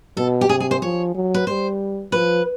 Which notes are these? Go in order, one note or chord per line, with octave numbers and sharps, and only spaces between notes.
B2 A4
G4
C3 G#4
G#4
C5
F3 C#5
F#3
B4
G3 C5
F3 B4